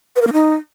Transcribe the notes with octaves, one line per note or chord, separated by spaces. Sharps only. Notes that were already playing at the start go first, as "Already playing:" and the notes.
B4
A#4
A#3
D#4